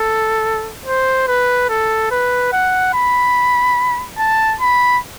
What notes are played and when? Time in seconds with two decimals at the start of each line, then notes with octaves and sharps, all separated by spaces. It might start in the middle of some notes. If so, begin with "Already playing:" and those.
Already playing: A4
0.86 C5
1.28 B4
1.69 A4
2.11 B4
2.52 F#5
2.94 B5
4.18 A5
4.61 B5